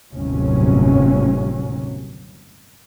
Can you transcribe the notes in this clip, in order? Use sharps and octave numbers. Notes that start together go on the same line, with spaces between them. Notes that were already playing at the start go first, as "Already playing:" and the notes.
G1 D#2 A2 C3 F#3 C#4